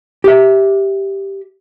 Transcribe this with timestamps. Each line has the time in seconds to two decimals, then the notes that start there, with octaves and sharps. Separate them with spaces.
0.24 G4 E5